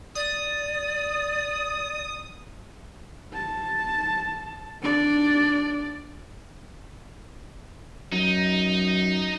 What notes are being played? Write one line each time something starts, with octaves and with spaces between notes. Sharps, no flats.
D5 D#6
A5
D4 D5
F#2 D#4